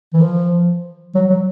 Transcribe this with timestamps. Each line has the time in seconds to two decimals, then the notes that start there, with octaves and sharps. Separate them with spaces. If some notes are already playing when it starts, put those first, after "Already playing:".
0.14 E3
0.21 F3
1.15 F#3
1.30 F#3